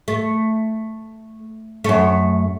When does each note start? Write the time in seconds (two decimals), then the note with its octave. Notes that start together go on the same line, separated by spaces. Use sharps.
0.08 A3
1.84 F#2 A3